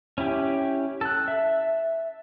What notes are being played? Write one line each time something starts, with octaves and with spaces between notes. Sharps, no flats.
C#4 E4 G4
A4 F#6
E5